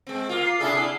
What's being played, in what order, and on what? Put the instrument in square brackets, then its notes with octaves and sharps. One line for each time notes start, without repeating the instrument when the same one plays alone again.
[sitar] G#3 C4
A#3 F4
[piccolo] C7
[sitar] C3 A3 A4 [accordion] D4 E4 G#4